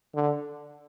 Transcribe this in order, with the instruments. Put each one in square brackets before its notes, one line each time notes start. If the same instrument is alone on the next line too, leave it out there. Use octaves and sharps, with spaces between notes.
[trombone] D3